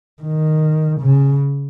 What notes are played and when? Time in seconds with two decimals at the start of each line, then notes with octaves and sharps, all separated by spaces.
0.22 D#3
1.00 C#3